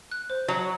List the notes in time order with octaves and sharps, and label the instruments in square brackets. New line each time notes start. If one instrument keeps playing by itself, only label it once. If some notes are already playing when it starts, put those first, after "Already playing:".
[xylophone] F#6
C5
[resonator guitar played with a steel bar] F#3 [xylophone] A#5